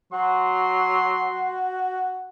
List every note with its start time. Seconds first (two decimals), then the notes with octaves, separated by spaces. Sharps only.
0.13 F#3 F#4 C6